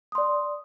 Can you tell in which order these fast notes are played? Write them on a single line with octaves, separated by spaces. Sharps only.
D#6 C6 D5